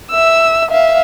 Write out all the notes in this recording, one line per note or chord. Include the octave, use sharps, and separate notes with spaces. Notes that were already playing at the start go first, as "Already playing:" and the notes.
E5 E6
E5 F5